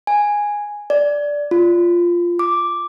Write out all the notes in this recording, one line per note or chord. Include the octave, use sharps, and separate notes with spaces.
G#5
D5
F4
D6